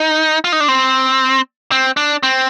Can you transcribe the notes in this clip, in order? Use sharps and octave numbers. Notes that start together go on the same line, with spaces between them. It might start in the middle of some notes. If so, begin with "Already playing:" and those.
Already playing: D#4
F4
D#4
D4
C4
C4
D4
C4